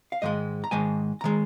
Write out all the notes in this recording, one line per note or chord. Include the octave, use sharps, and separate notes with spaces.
F5
G#2 D#3 G#3 D#5
A#5
G#2 D#3 G#3 G#5
D#3 G#3 A#5